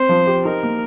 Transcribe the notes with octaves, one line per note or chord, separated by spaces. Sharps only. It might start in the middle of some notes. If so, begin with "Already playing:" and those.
Already playing: C4 C5
F3
G4
D#4 A#4
A#3